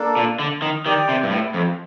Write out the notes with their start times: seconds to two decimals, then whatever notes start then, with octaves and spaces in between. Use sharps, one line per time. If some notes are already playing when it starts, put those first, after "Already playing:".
Already playing: A#3 D4 A4
0.16 A#2
0.39 D3
0.62 D#3
0.86 D#3 G4 D5 G5
1.09 C3
1.23 G2
1.31 A2
1.54 F2